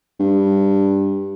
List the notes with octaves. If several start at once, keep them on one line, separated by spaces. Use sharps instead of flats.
G2